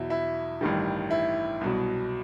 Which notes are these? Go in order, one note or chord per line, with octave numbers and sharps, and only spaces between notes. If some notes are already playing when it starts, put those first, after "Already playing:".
Already playing: E2 B2 F#3 E4
E4
A1 G2 D#3 G3
E4
C2 B2 F#3